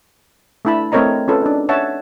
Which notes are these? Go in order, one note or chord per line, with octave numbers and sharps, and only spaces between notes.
A3 D4 E4 A5 B5
A3 C4 A#4 C#5 D#5 A#5
C#4 F4 A4 B4
D4 D#4
C#5 E5 F#5 A5